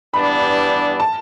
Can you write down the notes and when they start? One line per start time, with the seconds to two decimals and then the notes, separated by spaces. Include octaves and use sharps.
0.14 G2 E3 G3 B3 D4 B5
1.00 A5